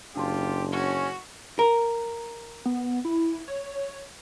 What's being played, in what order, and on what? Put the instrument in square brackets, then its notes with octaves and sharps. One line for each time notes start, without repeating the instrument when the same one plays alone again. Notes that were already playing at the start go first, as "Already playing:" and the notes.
[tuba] F#1 [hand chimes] D4 A5 C6 [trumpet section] F4 G4
[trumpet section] C#4 [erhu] F#4
[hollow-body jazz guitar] A#4
[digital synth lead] B3
E4
C#5